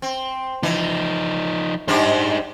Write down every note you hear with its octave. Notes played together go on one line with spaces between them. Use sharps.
C4
E3 F3 D#4
G#2 G3 D4 D#4 C5